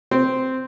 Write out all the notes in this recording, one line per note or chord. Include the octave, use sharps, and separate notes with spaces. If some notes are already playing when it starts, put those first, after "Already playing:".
C4